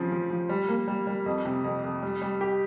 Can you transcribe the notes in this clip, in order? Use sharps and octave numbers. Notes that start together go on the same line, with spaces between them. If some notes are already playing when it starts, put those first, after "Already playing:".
Already playing: C#3 F3 C4
F3
F3
G3
A#3
G3
G3
F2
C3
F2
F2
G3
G3
G4